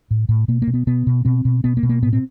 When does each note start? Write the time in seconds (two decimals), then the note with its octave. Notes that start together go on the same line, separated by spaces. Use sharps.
0.11 A2
0.29 A2
0.48 B2 A#3
0.62 A#3
0.67 B2
0.74 B3
0.87 B2 B3
1.07 B2
1.25 B2 C4
1.45 B2
1.64 B2 B3
1.77 A#3
1.83 B2
1.89 A#3
2.02 A2 B3
2.13 C4